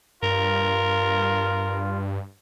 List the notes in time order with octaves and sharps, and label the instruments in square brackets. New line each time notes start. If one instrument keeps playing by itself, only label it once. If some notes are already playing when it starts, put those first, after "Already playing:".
[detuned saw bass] G2 [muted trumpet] F4 [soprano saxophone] A#4